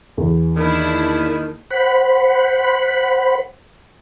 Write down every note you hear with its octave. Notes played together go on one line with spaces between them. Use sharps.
E2
D#3 A#3 D4 E4
C5 F#5 B5